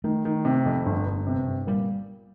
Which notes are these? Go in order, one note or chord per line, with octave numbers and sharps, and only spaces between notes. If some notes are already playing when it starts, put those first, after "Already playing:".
D#3 A3
D#3
C3
F2
G1
G1
C3
G1
A#2 G3